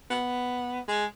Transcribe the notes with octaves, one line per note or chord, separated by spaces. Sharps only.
B3
G#3